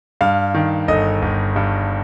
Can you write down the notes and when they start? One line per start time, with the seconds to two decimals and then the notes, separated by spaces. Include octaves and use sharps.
0.21 G2 F5
0.54 D#3
0.88 G1 D#5
1.22 G1
1.56 G2